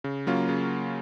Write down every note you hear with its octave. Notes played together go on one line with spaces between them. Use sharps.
C#3
F#3 A#3 C#4 F4
C#3